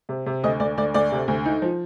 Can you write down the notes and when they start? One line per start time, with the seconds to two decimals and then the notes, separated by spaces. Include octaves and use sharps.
0.09 C3
0.26 C3
0.44 D2 D#5
0.60 D2 D5
0.77 D2 D5
0.94 D2 D5
1.12 C3
1.28 D2
1.45 D#4
1.62 F3